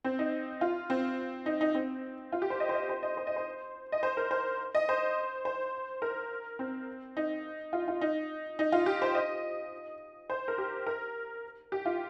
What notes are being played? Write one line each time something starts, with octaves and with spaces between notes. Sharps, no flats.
C4
D#4
F4
C4
D#4
D#4
C4
F4
G4
C5
D#5
C5
D#5
C5
D#5
C5
D#5
C5
D#5
C5
A#4
C5
D#5
C5
C5
A#4
C4
D#4
F4
F4
D#4
D#4
F4
G4
C5
D#5
C5
A#4
G4
A#4
G4
F4